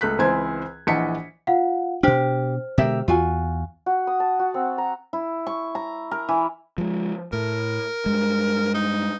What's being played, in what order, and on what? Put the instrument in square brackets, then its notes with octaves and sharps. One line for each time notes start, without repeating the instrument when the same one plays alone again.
[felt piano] C#2 A3 F#6 B6
C#2 E3 C4 C5 G#5 G#6
A#1 E3 D#5 F#5 B6 C#7
[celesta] F4 F5 F#5
[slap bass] B2 D4 [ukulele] G4 [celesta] C5 F6
[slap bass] B2 D3 G#3 [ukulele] G4 A#4 E5
[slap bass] E2 [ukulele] F4 F#4 G#5
[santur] F#4
D#6
A5
F#4
C4
A#5
[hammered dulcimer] E4
C#6
A#5
A#4
E3
[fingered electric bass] F3 G#3
[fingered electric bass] A2 [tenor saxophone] A#4
[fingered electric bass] G2 G#3
[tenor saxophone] D#4